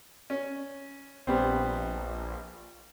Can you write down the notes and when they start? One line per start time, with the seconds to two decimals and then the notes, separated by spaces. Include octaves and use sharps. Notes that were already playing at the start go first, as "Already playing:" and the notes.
0.30 C#4
1.27 A#1 G3 B3 C4